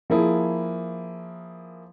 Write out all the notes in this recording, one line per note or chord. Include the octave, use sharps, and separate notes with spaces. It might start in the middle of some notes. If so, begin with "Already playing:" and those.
F3 A#3 E4 G#4